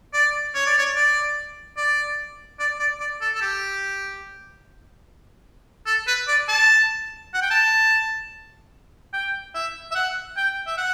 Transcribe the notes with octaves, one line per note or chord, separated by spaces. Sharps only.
D5
C#5
D5
C#5
D5
D5
D5
D5
D5
A4
A4
G4
A4
B4
D5
A5
F#5
G5
A5
G5
E5
E5
F#5
G5
E5
F#5